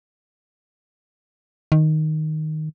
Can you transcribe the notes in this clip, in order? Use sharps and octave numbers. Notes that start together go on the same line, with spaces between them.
D#3